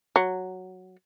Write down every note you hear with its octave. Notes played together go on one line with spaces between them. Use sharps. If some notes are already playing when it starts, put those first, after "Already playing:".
F#3